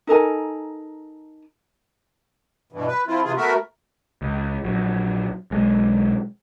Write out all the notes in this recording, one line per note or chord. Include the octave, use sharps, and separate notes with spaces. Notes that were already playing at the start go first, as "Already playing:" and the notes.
D#4 A4 A#4 G#5
G2 B2 E3
B4
F3 C4 E4 F4
C3 E3 F4 G#4
A3 B3 F#4 A#4 E5
C#2
A#1 F#3
B1 G#3